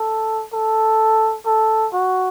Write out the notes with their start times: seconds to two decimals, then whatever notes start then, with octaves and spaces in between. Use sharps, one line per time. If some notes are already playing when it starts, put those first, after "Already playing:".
Already playing: A4
0.53 A4
1.46 A4
1.93 F#4